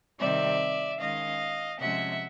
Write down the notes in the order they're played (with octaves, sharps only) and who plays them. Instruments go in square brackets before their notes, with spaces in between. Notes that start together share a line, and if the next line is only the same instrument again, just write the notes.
[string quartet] C3 D#3 G3 C4 D5 E5
D#3 G#3 C#4 D#5 F5
C3 F3 G#3 C#4 E5 F#5